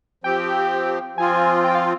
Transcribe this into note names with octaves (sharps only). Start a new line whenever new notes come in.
F3 C4 G4 G5
F3 C4 F4 G#5
G5
F5